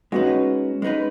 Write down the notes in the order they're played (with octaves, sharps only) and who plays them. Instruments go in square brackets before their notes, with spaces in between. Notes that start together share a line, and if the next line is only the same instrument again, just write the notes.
[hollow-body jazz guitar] G#3 B3 D#4 B4 [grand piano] C#4 F#4
[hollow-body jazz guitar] G#3 B3 D#4 B4